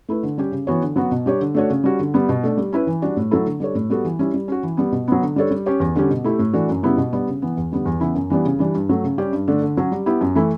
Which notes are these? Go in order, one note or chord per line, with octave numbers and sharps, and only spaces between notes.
A3 E4 B4
D3
G3 C#4 G4
C#3
E3 B3 F#4 C#5
D3
F#3 B3 F#4
B2
G3 D4 G4 C#5
D3
A3 D4 F#4 C#5
C#3
G3 C#4 F#4
D3
G3 B3
B2
A3 D4
G3
C#4 E4 B4
E3
G3 D4 F#4
A2
F#3 A3 E4 A4
D3
G3 D4 A4 C#5
A2
G3 B3 F#4 A4
E3
G3 C#4 E4
G3
C#4 F#4
E3
G3 B3
B2
F#3 B3
D3
G3 D4 A4 C#5
G3
C#4 G4 C#5
E2
D3 G3 C#4 G4
B2
A3 E4 G4
A2
E3 A3 D4 F#4
F#2
C#3 G3 B3 E4
B2
G3 B3 D4
C#3
E3 B3
E2
D3 G3 B3
E2
C#3 E3 B3 E4
F#2
E3 G3 B3 D4
C#3
E3 G3 D4
G2
F#3 A3
C#3
G3 C#4 G4 D5
G2
D3 A3 D4
D3
F#3 C#4
G3
B3 E4 G4
F#2
E3 A3 E4